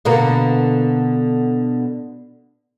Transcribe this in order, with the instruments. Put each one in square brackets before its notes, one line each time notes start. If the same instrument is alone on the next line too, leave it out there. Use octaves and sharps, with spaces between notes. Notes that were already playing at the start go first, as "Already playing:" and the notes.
[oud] B2 D3 A#3